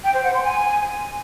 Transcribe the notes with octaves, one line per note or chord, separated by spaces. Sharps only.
G5
C5
F#5
C6
G#5